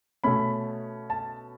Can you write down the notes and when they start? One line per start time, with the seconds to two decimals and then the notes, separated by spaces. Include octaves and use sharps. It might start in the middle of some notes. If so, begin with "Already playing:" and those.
0.24 B2 A3 C#4 B5
1.10 A5